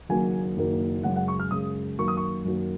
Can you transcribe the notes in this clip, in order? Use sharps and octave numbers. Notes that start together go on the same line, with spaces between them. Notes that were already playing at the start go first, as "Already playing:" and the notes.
F#1 F#2 D#3 F#3 A#3 G#5
F#1 F#2 D#3 F#3 A#3
F#2 C#3 G#3 F#5
F#5
C#6
F6
F#2 C#3 G#3 D#6
F#2 D#3 F#3 A#3 C#6
D#6
C#6
F#2 D#3 F#3 A#3